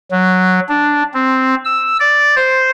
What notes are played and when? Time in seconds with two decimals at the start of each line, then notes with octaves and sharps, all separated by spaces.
0.11 F#3
0.69 D4
1.14 C4
1.65 E6
2.00 D5
2.36 C5